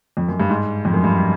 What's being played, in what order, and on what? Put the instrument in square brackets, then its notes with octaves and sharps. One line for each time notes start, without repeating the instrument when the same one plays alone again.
[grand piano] F2
F#2
G2
G#2
F2
F#2
G2